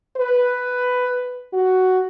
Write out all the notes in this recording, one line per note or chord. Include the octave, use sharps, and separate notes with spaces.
B4
F#4